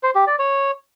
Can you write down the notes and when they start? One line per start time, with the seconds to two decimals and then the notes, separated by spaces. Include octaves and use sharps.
0.03 C5
0.15 G4
0.27 D5
0.39 C#5